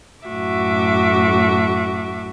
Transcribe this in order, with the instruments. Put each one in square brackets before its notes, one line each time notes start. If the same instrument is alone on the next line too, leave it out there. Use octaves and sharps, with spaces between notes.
[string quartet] F#2 A2 F#4 E5 D6